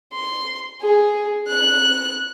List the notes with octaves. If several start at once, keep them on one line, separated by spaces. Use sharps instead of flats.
C6
G#4
F#6